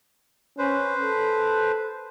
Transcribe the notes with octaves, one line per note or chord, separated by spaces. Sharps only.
C#4 B4 C5
A4